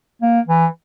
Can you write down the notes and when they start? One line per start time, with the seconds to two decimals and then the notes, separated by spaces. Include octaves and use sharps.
0.22 A#3
0.48 E3